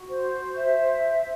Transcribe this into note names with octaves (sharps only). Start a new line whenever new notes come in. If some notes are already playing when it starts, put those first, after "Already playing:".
Already playing: F#4
C5
E5